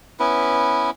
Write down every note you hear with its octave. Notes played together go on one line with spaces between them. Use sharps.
B3 C#4 E4 B4